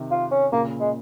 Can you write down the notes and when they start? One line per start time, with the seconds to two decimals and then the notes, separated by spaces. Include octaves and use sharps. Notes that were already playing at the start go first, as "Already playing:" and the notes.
Already playing: C3 D#3
0.11 F4
0.31 C#4
0.52 A#2 C#3 A#3
0.80 G#3